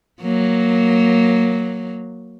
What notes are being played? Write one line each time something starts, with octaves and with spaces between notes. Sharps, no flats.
F#3 A#3